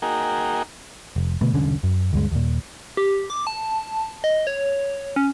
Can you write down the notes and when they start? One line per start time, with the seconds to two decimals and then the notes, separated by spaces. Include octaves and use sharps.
0.02 A#3 D#4 F#4 G#4 A#4 G5
1.16 F1
1.41 B2 D3 A3 B3
1.54 E1 C2 D3 C#4
1.83 F#2
2.13 D2 G2 G#3
2.32 D#2 A#2
2.97 G4
3.30 D6
3.47 A5
4.24 D#5
4.47 C#5
5.16 C#4